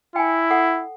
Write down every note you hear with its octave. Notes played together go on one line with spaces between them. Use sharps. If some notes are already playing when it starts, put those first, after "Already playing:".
E4 G5 G#5
A4 F#5